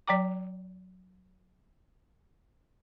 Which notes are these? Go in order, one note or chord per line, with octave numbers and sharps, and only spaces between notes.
F#3 D5 G5 A#5 D6